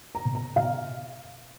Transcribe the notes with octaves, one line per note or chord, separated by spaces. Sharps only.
A#5
B2
A#5
B2 F5